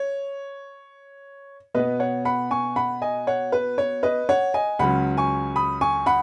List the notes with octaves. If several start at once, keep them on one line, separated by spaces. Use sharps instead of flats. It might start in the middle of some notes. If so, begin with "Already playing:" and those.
Already playing: C#5
B2 B3 B4 D#5
C#5 F#5
F#5 B5
G#5 C#6
F#5 B5
D#5 G#5
C#5 F#5
B4
C#5
B4 D#5
C#5 F#5
D#5 G#5
C#2 C#3 F#3 C#4 F#5 B5
G#5 C#6
B5 D#6
G#5 C#6
F#5 B5